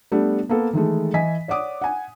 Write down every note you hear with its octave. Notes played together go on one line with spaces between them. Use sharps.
G3 A3 B3 D4
A#3 B3 A4 B4
D#3 E3 G#3 A3
E3 D#5 G#5 B6
C#5 D5 F#5 D6 D#6
F#5 G#5